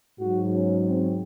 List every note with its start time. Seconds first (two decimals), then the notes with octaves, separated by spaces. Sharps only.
0.19 G#2 F#3 F#4
0.53 C#4
0.86 C4